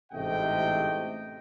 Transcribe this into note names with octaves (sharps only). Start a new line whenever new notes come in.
A1 G#2 C3 A3 D#5 G5